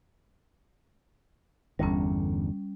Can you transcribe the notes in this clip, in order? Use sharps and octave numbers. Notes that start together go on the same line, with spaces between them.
G1 E2 D3 G3 C#4